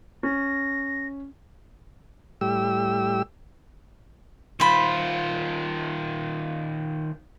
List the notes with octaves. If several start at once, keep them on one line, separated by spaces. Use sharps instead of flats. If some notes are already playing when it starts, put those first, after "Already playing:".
C#4 A#6
A2 G3 G4 E6
D#3 F4 C5 B5